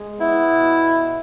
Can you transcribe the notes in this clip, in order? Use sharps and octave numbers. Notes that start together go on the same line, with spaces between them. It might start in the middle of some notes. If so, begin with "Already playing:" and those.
Already playing: G#3
B3 E4
B2